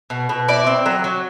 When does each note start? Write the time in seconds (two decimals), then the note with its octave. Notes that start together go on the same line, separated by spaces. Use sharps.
0.10 B2
0.29 B2
0.48 E4 D5
0.67 C4
0.86 F#3
1.04 F#3